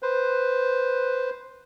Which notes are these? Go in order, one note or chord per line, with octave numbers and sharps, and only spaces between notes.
B4 C5